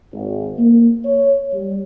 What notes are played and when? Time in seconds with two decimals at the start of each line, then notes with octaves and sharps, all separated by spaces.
0.13 G#1
0.58 A#3
1.05 C#5
1.53 G3